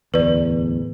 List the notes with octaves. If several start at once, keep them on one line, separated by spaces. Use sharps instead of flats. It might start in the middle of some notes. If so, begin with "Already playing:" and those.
D1 E2 B4 D5